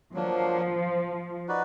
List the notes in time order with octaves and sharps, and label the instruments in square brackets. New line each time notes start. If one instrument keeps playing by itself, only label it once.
[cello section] F3 [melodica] F#3 A#3 D4
[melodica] D#4 F#4 B4 D5